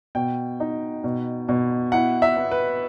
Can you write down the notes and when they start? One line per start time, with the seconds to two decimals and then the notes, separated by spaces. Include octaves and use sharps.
0.15 B2 G5
0.60 D#4
1.04 B2
1.49 B2
1.92 E4 F#5
2.22 E5
2.37 B3
2.51 B4